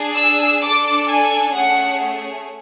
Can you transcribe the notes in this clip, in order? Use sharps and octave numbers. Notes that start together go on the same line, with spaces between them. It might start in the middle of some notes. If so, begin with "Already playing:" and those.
Already playing: D4 G#4
E6
D4 A4 D6
G#5
A3 C#4 G#4 F#5